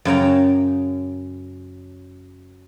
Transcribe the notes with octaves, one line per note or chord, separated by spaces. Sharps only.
F#2 C#3 G5 A#5